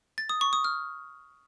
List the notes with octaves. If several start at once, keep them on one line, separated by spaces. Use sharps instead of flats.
A6
D#6
C#6
D#6
F6